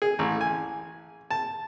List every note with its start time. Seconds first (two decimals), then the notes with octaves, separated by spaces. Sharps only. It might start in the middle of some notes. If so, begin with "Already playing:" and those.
0.02 G#4
0.19 A1
0.41 G#5
1.31 A5